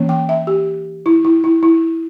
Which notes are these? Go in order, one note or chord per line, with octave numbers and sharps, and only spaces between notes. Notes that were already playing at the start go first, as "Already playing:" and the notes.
Already playing: E3 A#3 C#4
G5
E5
G4
E4
E4
E4
E4